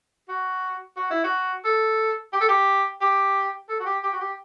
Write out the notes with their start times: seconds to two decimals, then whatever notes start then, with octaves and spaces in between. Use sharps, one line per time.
0.29 F#4
0.97 F#4
1.11 E4
1.24 F#4
1.64 A4
2.33 G4
2.41 A4
2.49 G4
3.01 G4
3.69 A4
3.80 F#4
3.86 G4
4.03 G4
4.13 F#4
4.20 G4